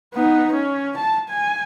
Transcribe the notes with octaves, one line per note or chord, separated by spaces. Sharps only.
B3 D#4
C#4
A5
G#5